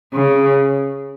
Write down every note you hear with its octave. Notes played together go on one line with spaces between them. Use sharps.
C#3